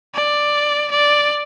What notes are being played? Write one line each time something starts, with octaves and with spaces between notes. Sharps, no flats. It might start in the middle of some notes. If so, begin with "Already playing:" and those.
D5
D5